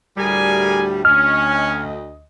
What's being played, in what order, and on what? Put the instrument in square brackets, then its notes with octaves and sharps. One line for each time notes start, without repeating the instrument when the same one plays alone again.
[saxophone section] D2 A2 G3 [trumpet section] G#4 A#4 G#5
[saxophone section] D2 D#5 [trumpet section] C#4 [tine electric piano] F6